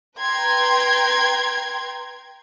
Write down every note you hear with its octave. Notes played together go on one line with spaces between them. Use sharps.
B4 G5 A#5 C6 G#6